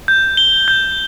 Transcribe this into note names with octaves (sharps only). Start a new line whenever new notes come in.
G6
G7
G6